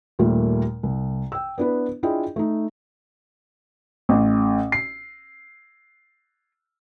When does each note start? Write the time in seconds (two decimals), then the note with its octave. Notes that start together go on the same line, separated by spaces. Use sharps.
0.19 D#2 A#2 G3 A3
0.83 C2
1.32 G5 E6
1.58 B3 D4 E4 B4
2.03 D4 E4 F4 G#4 D#5 G5
2.36 A3 D#4
4.09 A1
4.72 C7